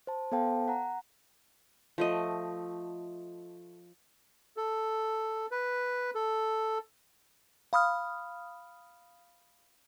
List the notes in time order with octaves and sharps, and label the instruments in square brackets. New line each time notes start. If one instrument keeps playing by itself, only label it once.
[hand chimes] C5 A5
B3 A4 C5 F5 G5 A5
F#5 A#5
[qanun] F3 A3 D#5
[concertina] A4
B4
A4
[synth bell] F5 B5 D#6 F6